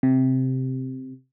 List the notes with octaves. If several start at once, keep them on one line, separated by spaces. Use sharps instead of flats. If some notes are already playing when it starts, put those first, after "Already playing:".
C3